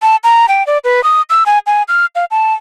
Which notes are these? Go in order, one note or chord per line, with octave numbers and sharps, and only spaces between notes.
A5
A#5
G5
D5
B4
D#6
E6
G#5
G#5
F6
F5
A5